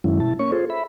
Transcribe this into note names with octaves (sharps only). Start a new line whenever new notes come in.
F#2 D#3 F#3 G#3 C#4 E4
B2 E4 A5
A#3 C#4 C#5 C#6
F4 G#4 A4 C5
E5 B5